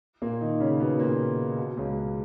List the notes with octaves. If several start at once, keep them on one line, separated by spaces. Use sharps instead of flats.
A#2 A#3
D#3 D#4
C#3 C#4
B2 B3
A#2 A#3
B2
C#2 C#3